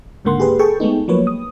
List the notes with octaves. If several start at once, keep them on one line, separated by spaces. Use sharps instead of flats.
C#2 G#2 D3 A#3 F#5 C6
G4 G#4 B4
G#4 A4 G5 A5 C#6
G#3 A3 B3 D#4
F3 F#3 A#3 B4 C#5
D#6